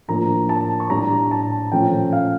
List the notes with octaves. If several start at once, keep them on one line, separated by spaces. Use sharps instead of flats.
A2 F3 A#3 D4 A#5
A5
C#6
A2 G3 D4 A#5
A5
A#2 F3 A3 C#4 G5
F5